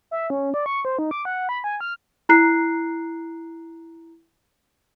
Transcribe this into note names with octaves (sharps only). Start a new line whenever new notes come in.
E5
C#4
D5
C#6
C5
D#4
D6
F#5
B5
G#5
F6
E4 A#5 F#6 C7